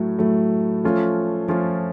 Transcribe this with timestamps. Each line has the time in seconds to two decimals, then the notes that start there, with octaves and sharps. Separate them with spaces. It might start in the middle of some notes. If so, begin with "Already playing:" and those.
Already playing: A2 F#3 A3
0.19 A2 F#3 A3
0.84 F3 A3 C#4 F4
1.48 F3 A3 C#4 F4